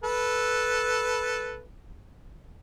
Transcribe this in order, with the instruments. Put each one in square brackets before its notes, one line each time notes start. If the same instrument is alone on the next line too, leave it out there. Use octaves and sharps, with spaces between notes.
[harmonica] A4 B4